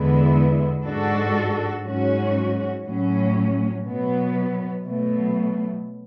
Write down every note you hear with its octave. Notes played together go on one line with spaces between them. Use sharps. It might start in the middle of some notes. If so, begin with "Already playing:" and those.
Already playing: E2 D3 G#3 B3 E4
G#2 G#3 D4 F#4 A4
G#2 F#3 C#4 F#4
A2 F#3 C#4
B2 F#3 B3
B2 F#3 A3